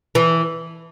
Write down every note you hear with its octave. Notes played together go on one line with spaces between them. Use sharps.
E3